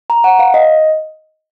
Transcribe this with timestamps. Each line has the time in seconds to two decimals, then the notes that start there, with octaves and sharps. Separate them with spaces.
0.10 A#5
0.24 F#5
0.39 F5
0.54 D#5